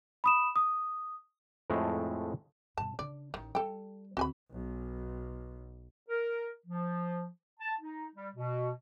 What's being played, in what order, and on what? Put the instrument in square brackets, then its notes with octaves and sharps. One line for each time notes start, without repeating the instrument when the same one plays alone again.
[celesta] B5 D#6 E7
D#6
[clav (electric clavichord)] F2 A2 G#3 A3
[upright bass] G2 B2 [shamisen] A5
[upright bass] C#3 D4 [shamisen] D5
[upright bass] A1 D#4 [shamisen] D#3
[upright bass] G3 [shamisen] A4 G5
[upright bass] D2 C4 [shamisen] F#4 G#5 B5
[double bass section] B1
[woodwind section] A#4
F3
A5
D#4
G3
B2